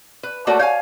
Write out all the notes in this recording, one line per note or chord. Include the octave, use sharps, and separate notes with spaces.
B4
A3 A#3 F#4 A4 C#5 D5
C#5 F5 G5 G#5